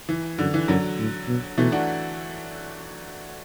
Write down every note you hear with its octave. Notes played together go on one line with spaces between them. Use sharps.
E3
F#2 D3
E3
F#2 D3 F#3
A2
B2
B2 E3 A3
D4 F#4